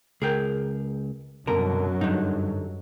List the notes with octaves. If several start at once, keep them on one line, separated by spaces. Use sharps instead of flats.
C#2 G#4 A#4 G5
C2 F#2 B2 D3 F#3 A#4
G2 D3 D#4